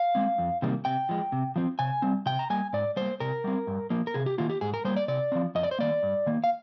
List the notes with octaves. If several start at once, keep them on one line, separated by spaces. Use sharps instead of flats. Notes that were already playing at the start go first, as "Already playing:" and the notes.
Already playing: F5
G#3 C4
F2
C3 D#3 G3 A#3
C3 G5
F3 G#3
C3
F3 C4
C3 G#5
G3 C4
C3 G5
A#5
G3 A#3 G#5
G#2 D5
G3 A#3 C5
C3 A#4
G3 C4
G2
F3 A#3
A#4
C3 G#4
G4
D#3 A#3 F4
G4
G#2 G#4
A#4
G3 A#3 C5
D5
C3 D5
F3 C4
F2 D#5
D5
C5
D#3 A#3 D5
G2
D#3 A#3
F5